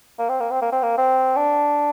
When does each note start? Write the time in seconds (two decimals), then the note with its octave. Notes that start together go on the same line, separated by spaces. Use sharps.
0.19 A#3
0.29 C4
0.40 A#3
0.51 C4
0.62 A#3
0.72 C4
0.83 A#3
0.98 C4
1.36 D4